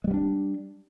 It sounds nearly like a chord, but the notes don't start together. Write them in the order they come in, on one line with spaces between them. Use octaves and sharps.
G#3 G3 B3 D4